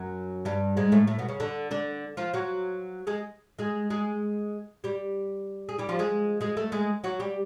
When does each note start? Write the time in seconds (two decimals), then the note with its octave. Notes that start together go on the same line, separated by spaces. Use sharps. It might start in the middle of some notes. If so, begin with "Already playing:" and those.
Already playing: F#2 F#3
0.45 G2 G3
0.77 G#2 G#3
0.92 A2 A3
1.07 A2 A3
1.19 B2 B3
1.29 C#3 C#4
1.40 D3 D4
1.71 D3 D4
2.17 F3 F4
2.34 F#3 F#4
3.07 G#3 G#4
3.59 G#3 G#4
3.90 G#3 G#4
4.84 G3 G4
5.69 G#4
5.78 G3 G4
5.89 F3 F4
5.99 G#3 G#4
6.41 G#3 G#4
6.57 A3 A4
6.72 G#3 G#4
7.04 F#3 F#4
7.20 G3 G4